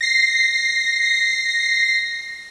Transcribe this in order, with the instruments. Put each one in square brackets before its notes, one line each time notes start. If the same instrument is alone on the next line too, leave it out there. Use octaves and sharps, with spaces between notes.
[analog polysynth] A#6 C7